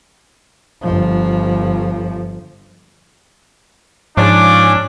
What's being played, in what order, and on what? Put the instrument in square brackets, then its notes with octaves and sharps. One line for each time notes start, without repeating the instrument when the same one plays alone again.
[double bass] G1 F3
[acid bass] G#2 [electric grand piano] F3 F4 C#5 [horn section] C#4 D4 [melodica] D6